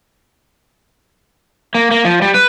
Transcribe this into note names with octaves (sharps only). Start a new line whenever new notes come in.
A#3
A#3
F3
G3
B4